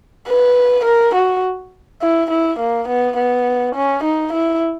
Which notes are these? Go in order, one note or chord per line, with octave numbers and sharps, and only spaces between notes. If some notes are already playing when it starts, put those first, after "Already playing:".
B4
A#4
F#4
E4
E4
A#3
B3
B3
C#4
D#4
E4